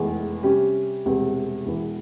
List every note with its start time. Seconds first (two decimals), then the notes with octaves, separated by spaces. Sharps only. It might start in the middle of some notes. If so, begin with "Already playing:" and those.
Already playing: F1 E2 E3 G#3
0.43 C3 G3 C#4 G4
1.05 E1 E2 C3 G3 C4
1.65 E1 E2 E3